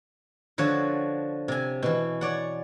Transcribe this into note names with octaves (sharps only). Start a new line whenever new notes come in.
D3 F3 F#4 C#5
C3 G#5
B2 E3
C#5 D5 F#5